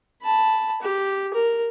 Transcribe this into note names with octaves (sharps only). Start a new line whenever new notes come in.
A5 B5
G4
A#4